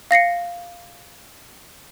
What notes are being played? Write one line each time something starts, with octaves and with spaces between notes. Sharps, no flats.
F5 A#6 C7 C#7